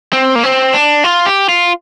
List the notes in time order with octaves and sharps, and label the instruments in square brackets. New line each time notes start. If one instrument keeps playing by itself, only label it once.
[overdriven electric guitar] C4
A#3
C4
D4
F4
G4
F4